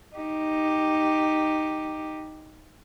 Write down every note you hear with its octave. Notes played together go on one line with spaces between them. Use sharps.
D#4 G4